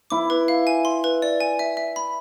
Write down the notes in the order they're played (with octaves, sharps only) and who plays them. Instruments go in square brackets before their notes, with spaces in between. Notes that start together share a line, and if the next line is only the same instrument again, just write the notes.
[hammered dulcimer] E4 [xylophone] D6
[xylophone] B4
F5
G#5
C6
B4
D5
G#5
E5
E5
B5